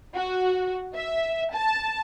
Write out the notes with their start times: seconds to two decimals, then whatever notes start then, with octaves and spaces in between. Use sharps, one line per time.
0.15 F#4
0.95 E5
1.53 A5